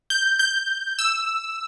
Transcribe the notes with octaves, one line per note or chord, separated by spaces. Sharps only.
G6
G6
E6